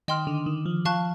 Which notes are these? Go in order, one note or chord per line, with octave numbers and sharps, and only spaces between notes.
D#3 D#5 G5 C6 F6
D3
D#3
F3
F3 F5 A5 C#6 F#6